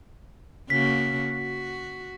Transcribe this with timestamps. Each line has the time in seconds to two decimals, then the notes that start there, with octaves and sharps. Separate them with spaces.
0.70 C#3 A#3 F#4 B6
1.31 F#4